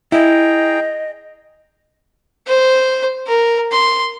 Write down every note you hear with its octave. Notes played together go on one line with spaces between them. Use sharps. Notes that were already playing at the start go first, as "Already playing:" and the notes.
E4 G#4 D#5 G5 A#5
C5
A#4
C6